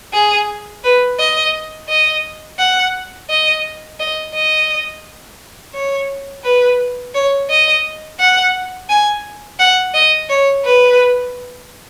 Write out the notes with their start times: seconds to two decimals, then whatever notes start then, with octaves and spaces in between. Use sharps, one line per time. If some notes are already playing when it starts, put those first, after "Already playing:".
0.13 G#4
0.84 B4
1.19 D#5
1.89 D#5
2.59 F#5
3.30 D#5
4.00 D#5
4.35 D#5
5.74 C#5
6.44 B4
7.15 C#5
7.50 D#5
8.20 F#5
8.89 G#5
9.60 F#5
9.95 D#5
10.30 C#5
10.65 B4